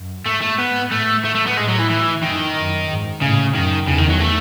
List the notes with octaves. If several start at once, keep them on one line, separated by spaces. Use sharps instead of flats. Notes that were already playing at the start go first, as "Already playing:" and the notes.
Already playing: F#2
G#2 A3
A3
B3
A2 A3
A3
A3
B3
A2 G#3
F#3
E3
E3
F#2 D#3
F#2
G#2
A2 C#3
F#2 D#3
E2 C#3
D#3
F#3
A3